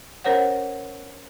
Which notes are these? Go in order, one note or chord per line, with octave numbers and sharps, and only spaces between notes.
C#4 A#4 C5 C#5 F#5